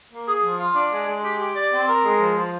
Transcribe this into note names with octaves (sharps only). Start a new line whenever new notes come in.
A#3
G#4
F3
F4
D4
G#3
G#3
G4
G4
D5
C4
A#4
G#3
F3
F3